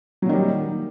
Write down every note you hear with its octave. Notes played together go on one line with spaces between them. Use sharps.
A#2 D#3 F#3 G3